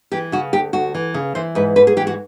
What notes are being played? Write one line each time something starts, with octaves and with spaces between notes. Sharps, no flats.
E3 G4
C#3 F#4
D2 G4
D2 F#4
E3
C#3
E3 C5
G#2 B4
G#2 B4
G#4
E3 G4
F#4